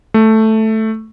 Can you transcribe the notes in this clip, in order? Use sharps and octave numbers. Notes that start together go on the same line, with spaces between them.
A3